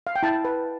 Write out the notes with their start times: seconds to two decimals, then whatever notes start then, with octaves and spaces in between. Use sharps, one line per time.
0.07 F5
0.16 G5
0.23 E4 A5
0.45 B4